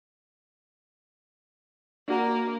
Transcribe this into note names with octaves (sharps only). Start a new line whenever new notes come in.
A#3 D4 F#4 A#4